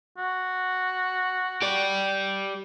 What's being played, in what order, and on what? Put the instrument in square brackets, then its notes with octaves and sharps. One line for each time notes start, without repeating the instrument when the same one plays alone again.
[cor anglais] F#4
[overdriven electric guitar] G4 D5